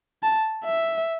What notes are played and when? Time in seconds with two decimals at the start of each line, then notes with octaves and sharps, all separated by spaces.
0.23 A5
0.64 E5